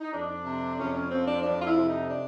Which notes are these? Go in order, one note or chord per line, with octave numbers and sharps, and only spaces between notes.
D#4
F2 D4
C3
F2 C#4
C#4
F3 C4
D4
F2 D4
F4
E4
C3
D#4
D4